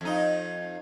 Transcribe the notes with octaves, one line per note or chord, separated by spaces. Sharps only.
F2 D#4